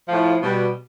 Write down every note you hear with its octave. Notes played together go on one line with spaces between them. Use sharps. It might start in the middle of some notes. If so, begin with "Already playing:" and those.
A2 F3
B2 G3